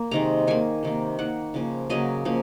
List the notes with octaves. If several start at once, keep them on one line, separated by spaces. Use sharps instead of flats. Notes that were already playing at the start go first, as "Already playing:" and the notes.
Already playing: A#3
C3 D#3 G#3 A#5
D#3 A#3 G#5
C3 D#3 A#3
D#3 A#3 F#5
C#3 F3 A#3
C#3 F#3 A#3 D#5
C#3 F3 A#3